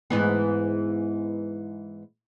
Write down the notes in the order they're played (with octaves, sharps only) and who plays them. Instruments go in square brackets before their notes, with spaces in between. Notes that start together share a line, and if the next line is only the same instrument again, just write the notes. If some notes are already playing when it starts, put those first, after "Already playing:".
[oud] G#2 E3 B3